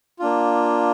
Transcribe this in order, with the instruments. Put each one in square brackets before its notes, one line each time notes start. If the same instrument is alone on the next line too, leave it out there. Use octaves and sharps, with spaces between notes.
[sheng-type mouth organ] A#3 D4 F4